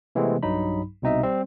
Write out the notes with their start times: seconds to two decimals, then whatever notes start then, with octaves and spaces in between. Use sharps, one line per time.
0.15 C3 E3 G#3 A3 B3 C4
0.43 B1 G2 F#3 D#4 B5
1.02 C2 B2 C4 D#4 D#5 E5
1.23 G3 C4